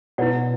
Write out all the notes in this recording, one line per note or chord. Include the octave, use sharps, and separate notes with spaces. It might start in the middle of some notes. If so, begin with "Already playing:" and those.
B2 E4 B4 D5 F#5